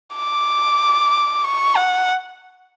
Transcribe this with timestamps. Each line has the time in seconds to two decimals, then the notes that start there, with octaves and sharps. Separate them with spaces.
0.15 D6
1.44 C#6
1.76 F#5